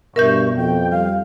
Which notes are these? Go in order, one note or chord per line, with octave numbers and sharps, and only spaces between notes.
G2 B2 A#4 E5 C#6 G6
F2 G5
G3 F5